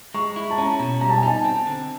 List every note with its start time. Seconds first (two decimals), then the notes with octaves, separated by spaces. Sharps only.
0.14 G#3 C#6
0.36 E4
0.51 A5
0.58 C#4 A#5
0.80 B2
1.01 G3 A#5
1.09 A5
1.17 G#5
1.23 D#4 A5
1.45 C4
1.67 D3